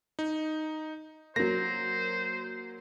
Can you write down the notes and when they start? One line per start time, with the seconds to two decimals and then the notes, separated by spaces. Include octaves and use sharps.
0.19 D#4
1.36 F#3 A#3 C5 A#6